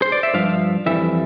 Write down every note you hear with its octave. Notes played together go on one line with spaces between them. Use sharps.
C5
D5
E5
G2 F3 F5
F2 E3 G3 E5